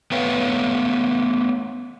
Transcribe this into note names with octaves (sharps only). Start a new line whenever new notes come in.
A3 B3 B4 C#5 F5 G5